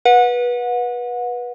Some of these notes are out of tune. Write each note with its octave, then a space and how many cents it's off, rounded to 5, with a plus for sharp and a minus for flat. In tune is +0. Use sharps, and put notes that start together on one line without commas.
B4 -20 F#5 -30